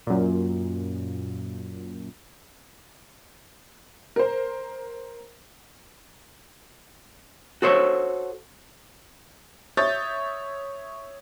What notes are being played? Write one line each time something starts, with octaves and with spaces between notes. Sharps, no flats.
F#2 A#2
A#4 C5
F#4 A4 C5 C#5
C#5 E5 D#6 G6 A6